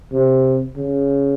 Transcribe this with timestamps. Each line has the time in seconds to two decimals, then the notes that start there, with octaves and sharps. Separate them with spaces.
0.13 C3
0.77 C#3